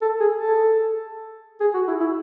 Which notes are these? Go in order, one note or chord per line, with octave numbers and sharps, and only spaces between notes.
A4
G#4
A4
G#4
F#4
E4
E4